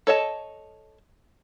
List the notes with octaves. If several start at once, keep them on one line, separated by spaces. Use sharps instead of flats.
A4 C#5 D#5 A5